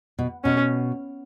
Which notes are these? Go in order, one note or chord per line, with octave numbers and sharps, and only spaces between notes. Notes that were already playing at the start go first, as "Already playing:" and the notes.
B2
B2 C#4